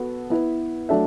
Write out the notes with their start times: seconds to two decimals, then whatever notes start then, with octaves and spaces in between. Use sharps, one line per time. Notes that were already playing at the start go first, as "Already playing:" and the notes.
Already playing: B3 F#4 A4
0.30 B3 E4 B4
0.89 F#3 A3 D4 A4 E5